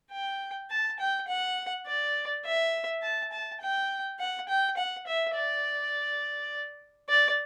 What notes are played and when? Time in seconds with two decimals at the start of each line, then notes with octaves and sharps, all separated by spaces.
0.12 G5
0.70 A5
0.99 G5
1.28 F#5
1.87 D5
2.45 E5
3.02 A5
3.32 A5
3.61 G5
4.19 F#5
4.49 G5
4.77 F#5
5.07 E5
5.35 D5
7.09 D5